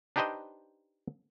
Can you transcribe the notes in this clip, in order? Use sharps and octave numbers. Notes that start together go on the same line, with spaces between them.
D4 D#4 G4 B4 C5 D#5